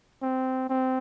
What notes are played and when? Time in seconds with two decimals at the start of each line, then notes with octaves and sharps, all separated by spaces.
0.22 C4
0.69 C4